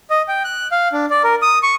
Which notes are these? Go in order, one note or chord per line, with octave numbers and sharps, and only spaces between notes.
D#5
G5
F#6
F5
D4
D5
A#4
D#6
C#6